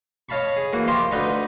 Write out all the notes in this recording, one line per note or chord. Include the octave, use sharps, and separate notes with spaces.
C#5 D#5 F5 A5 B5 C#6
G#4
E3 A#3 F#4
F3 F4 G4 C5 D#5
D2 D#4 B4 D#5 A#5 C#6